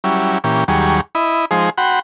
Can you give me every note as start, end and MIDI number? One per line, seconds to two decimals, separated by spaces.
0.04 0.38 54
0.04 0.38 55
0.04 0.38 61
0.04 0.38 64
0.44 0.64 46
0.44 0.64 52
0.44 0.64 61
0.44 0.64 67
0.68 1.01 39
0.68 1.01 54
0.68 1.01 55
0.68 1.01 68
0.68 1.01 85
1.15 1.45 64
1.15 1.45 75
1.15 1.45 83
1.51 1.70 53
1.51 1.70 56
1.51 1.70 63
1.51 1.70 68
1.51 1.70 72
1.78 1.99 66
1.78 1.99 78
1.78 1.99 79
1.78 1.99 83
1.78 1.99 84